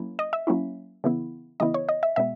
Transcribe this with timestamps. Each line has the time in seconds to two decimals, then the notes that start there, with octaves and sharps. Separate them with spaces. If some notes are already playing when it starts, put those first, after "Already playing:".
Already playing: F#3 A#3 C#4 E4
0.19 D#5
0.33 E5
0.47 F#3 A#3 C#4 E4
1.04 C#3 E3 B3 E4
1.60 C#3 E3 B3 E4 D#5
1.74 C#5
1.89 D#5
2.03 E5
2.16 B2 G#3 B3 E5